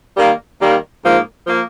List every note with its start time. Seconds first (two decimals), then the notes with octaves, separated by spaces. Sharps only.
0.16 D#3 G3 A#3
0.60 D#3 G3 A#3
1.03 G#2 F3 A#3
1.47 F3 A#3